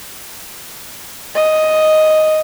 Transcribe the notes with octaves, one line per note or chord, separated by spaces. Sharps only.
D#5